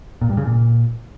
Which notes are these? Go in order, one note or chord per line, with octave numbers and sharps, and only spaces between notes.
A#2
G2
C#3
A#2